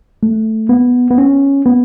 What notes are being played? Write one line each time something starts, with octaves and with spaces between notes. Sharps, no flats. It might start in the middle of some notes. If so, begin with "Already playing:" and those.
A3
B3
B3
C#4
B3